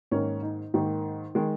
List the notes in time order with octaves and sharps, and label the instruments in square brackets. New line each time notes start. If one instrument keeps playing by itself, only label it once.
[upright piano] G#2 D#3 A#3 C#4
D#4
G#2 D#3 A#3
D#3 G#3